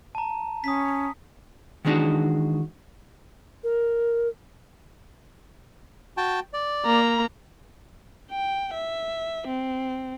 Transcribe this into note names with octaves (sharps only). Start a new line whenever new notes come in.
A5 A#5
C#4 D#6 B6
D#3 E3 G#3 D4 D#4 F#4
A#4
F#4 G5 A5
D5
A#3 A#5
G5
E5
C4